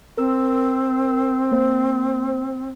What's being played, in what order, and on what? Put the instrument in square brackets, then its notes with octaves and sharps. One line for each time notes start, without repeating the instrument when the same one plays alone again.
[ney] C4 [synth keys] A#4 E6
[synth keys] A#3 C5